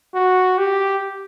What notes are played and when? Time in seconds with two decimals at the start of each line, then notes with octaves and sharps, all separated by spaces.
0.14 F#4
0.58 G4